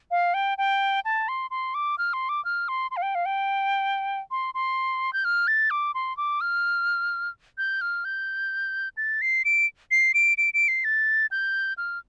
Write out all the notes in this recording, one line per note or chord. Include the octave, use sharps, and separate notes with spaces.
F5
G5
G5
A5
C6
C6
D6
F6
C6
D6
F6
C6
C6
F5
G5
F5
G5
C6
C6
G6
F6
A6
D6
C6
D6
F6
G6
F6
G6
A6
C7
D7
C7
D7
D7
D7
C7
A6
G6
F6